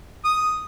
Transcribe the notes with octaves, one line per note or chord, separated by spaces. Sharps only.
D#6